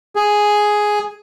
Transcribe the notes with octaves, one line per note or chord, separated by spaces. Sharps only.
G#4